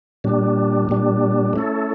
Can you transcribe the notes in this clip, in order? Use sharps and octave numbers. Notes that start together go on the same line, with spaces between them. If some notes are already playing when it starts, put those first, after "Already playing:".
A#2 G3 D4
A#2 G3 D4
A3 C#4 E4 A4